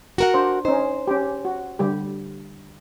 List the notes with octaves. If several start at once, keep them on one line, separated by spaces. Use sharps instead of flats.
F#4 A#4 F#5
D4 C5
C#4 D#4 C5
C#4 G4
F#4
D3 G3 G4